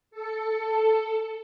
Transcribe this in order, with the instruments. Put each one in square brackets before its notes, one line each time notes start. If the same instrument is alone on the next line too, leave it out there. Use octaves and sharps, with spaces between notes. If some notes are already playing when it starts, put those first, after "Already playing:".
[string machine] A4 C#7